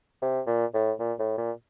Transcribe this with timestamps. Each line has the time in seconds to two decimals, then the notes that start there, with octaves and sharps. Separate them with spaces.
0.22 C3
0.47 A#2
0.74 A2
0.99 A#2
1.19 A2
1.38 A#2